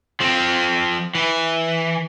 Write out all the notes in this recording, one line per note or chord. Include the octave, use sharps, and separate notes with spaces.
F3 C4
E3